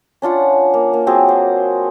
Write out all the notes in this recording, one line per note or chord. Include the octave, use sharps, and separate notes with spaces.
C#4 D4 F4 F#5
A#3
A#3
F#3 C4 F#4 G#4
C5